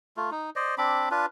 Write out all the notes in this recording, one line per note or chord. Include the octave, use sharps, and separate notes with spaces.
A3 F4
D#4
C5 D5 D#5
C4 D4 B5 D6
D4 F4 B4